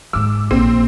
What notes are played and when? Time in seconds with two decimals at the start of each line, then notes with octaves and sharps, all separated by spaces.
0.13 G#2 D#3 D6 E6
0.51 A#1 C4